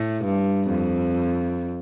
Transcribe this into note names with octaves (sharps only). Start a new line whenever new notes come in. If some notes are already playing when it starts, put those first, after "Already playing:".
Already playing: A2
G2
F2